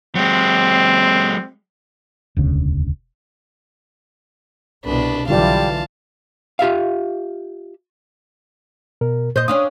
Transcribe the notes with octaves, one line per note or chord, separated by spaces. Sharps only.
F#3 G#3 C4
E1 D2 C#3
C2 B2 D4 B4
B1 D3 E3 G3 F4 D5 F5 A5
F4 G4 E5 F5
B2 A#4
A#2 C5 D#5 G6
C#4 D4 F5 D#6